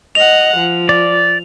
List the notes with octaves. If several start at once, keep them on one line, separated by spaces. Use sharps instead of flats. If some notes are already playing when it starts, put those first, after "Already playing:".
D#5 F#5 F7
F3
D5